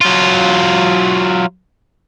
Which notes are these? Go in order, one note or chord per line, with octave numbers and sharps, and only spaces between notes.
F#3 F4